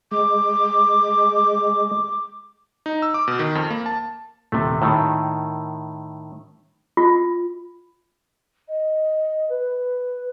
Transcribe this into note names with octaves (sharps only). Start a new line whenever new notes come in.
G#3 D6
D#4
E6
D6
B2
D#3
F2
A#3
A5
D#1 C3 A3
A2 D#3 E6
F4
D#5
B4